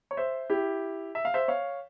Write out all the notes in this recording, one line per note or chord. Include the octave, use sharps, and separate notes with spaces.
C#5
C5 E5
E4 G4
E5
F5
C5 E5
C#5 F5